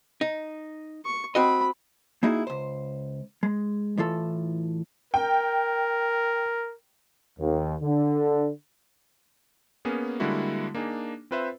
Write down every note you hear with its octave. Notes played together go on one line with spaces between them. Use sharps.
D#4
C#6
C4 F#4 D#5 B5
A#3 D#4 E4 F#4 G#4
C#2 C5
G#3
A2 E3 F4 A4
A#4 G5
D#2
D3
A#3 B3 C#4 G#4 A#4
D3 G3 G#3 A#3 E4 F#4
A#3 D4 D#4 G#4
C4 F4 B4 C5 E5